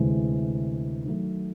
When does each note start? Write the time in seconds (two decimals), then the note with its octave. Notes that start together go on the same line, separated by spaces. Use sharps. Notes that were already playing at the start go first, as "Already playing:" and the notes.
Already playing: D2 C3 E3 G#3
1.05 D#3 F#3 A3